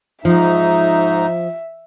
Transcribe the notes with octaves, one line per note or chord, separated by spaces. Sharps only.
G#2 F3 D#4 E5